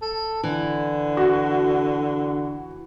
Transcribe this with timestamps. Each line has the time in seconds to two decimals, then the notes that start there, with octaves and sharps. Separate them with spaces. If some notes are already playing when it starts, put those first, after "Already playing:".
0.02 A4
0.44 D3 E3
1.17 F#4